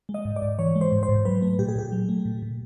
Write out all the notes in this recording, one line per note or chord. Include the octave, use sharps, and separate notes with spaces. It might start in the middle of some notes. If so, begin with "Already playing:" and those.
G#3
D#5
G#2
D5
G#2
E3 C#5
G#3
C5
G#2
C5
G#2
F#3 B4
A3
A#2 G4
G#4
A#2 G4
F#3
A3
A#2
A#2